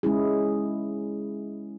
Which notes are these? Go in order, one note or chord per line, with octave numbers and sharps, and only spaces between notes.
G#3 C#4 E4 G#4